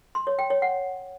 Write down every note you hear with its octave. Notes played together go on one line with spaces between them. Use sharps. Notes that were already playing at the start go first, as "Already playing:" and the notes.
C6
C#5
G5
C#5
F#5